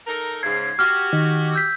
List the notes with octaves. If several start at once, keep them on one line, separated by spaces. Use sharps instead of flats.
D#4 A4 A#4
G#2 C#3 G#6 C7
F#4 G4 F6
D#3
E6 G6 B6